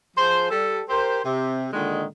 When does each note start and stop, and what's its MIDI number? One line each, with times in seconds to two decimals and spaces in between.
0.17 0.46 53
0.17 0.46 68
0.17 0.46 72
0.50 0.82 55
0.50 0.82 69
0.88 1.19 67
0.88 1.19 70
0.88 1.19 72
1.25 1.67 48
1.72 2.04 46
1.72 2.04 50
1.72 2.04 51
1.72 2.04 56